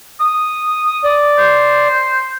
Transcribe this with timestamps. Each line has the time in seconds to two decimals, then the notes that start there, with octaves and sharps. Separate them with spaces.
0.21 D#6
1.04 D5
1.38 C5